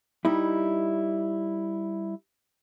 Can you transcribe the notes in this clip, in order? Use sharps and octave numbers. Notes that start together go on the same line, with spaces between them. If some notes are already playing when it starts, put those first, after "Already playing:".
G3 D#4 E4